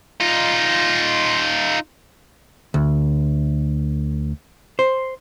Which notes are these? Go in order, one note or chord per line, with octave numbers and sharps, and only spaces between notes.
D#4 F4
D2
C5